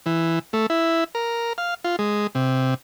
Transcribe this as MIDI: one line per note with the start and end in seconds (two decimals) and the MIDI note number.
0.06 0.39 52
0.53 0.66 57
0.70 1.04 64
1.15 1.53 70
1.58 1.74 77
1.84 1.96 65
1.99 2.27 56
2.35 2.74 48